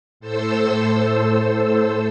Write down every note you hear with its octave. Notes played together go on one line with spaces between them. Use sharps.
A2 A4 C5 E6